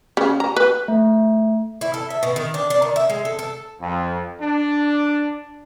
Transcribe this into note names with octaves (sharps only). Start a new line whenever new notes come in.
C#3
A#5
B4
A3
E4
A4
E5
B2
D#3
D4
D4
D#3
E5
G#3
A4
A4
F2
D4